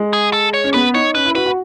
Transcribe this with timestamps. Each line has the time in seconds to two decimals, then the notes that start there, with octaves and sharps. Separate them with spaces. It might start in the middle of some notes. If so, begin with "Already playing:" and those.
Already playing: G#3
0.13 G#4
0.33 A4
0.54 C#5
0.64 C#4
0.74 B3 B4
0.94 D#4 C#5
1.15 C#4 B4
1.26 E4
1.35 F#4 B4
1.46 F#4